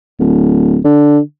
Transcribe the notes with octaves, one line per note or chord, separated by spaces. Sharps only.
D1
D3